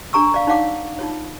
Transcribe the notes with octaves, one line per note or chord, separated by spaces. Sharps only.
D4 A4 A#5 C#6 E6
D5 F5
D#4 C#5 D5 F5 F#5 D6
D#4 F4 C#5